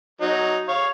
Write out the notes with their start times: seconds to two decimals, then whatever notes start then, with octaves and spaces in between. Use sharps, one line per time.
0.21 F#3 D#4
0.68 C#5 F5